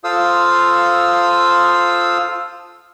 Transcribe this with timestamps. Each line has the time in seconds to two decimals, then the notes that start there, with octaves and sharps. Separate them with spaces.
0.04 F4 A4 C5 F5 D#6 E6